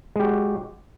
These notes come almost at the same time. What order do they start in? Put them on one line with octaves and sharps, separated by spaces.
G#3 G4 F#4